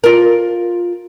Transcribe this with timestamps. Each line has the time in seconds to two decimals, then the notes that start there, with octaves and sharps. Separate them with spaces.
0.04 F4 A#4